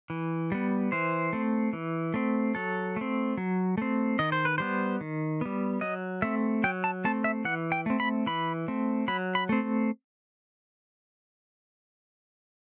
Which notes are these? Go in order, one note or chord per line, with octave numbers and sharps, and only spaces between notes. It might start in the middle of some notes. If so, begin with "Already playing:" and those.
E3
G3 B3
E3 C5
A3 C4
E3
A3 C4
F#3 A4
A3 C4
F#3
A3 C4
D#3 D#5
C5
B4
G3 B3 C5
D#3
G3 B3
F#3 D#5
A3 C4 E5
F#3 G5
A5
A3 C4 A5
E5
E3 F#5
G5
A3 C4
B5
E3 B5
A3 C4
F#3 B5
B5
A3 C4